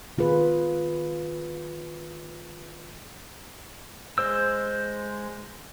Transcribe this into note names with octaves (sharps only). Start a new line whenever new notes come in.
D#3 F4 G#4 B4
G#3 C5 E6